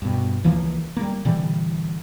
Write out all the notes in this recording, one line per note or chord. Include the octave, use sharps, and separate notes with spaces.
G2 B2
C#2 E3 F3 A#3
G3 A#3
A#2 D3 E3 G3